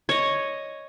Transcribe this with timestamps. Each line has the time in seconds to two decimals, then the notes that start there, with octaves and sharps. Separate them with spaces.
0.09 C#5 D#5